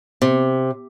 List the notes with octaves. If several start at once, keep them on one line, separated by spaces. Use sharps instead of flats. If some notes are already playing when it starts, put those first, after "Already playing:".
C3